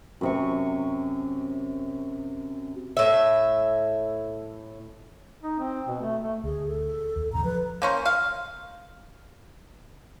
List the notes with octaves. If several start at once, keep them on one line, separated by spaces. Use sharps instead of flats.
F#2 C3 C#6
A2 E5
D#4
C4
B2
A3
A3
D2 G#4
A4
D#2
D#1 A1 C#3 A#5
F3 F#3 B4
A#3 C#4 C5
F5